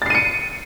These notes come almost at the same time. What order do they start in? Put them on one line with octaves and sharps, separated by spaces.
A6 C7 D#7 C#7